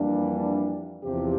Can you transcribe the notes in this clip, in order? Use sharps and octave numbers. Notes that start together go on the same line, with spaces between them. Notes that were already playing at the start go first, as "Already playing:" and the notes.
Already playing: F2 E3 G3 A#3 D4
E2 C3 F3 C4 G4